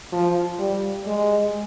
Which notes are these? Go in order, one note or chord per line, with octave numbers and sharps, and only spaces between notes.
F3
G3
G#3